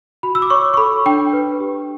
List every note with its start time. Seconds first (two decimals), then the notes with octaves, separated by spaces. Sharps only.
0.23 F#4 B5
0.35 E6
0.42 D6
0.50 C#5 C#6
0.74 C#6
0.77 A4 B5
1.06 D4 G5
1.33 B4
1.60 G4